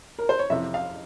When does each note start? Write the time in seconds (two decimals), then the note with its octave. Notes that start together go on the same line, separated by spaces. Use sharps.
0.19 A#4
0.29 C5
0.39 C#5
0.50 F2 C3 E3 E5
0.74 F5